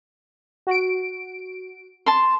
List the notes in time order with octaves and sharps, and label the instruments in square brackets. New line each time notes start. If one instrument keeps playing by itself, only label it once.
[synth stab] F#4 D7
[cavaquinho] A5 C6